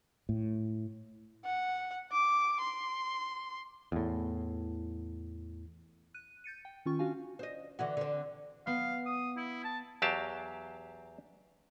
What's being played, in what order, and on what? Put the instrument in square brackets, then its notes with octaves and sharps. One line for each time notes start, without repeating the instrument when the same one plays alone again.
[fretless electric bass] A2
[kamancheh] F#5
D6
C6
[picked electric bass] E2 A2
[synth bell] F#6 D#7
G6 A6 C#7 D#7
G5
D#3 C#4 F4 C#6
C#4 D4 F#4 F5 G#5
[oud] C5 D#5
D3 E3 F#4
D3 C4
[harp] B3 [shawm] F5
[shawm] D#6
E4
A5
[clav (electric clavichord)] E2 F#3 G4 F5 A5